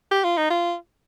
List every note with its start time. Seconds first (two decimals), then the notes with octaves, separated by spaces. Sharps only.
0.11 G4
0.24 F4
0.37 D#4
0.50 F4